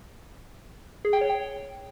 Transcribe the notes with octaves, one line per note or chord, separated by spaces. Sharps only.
G#4
G5
C#5
G5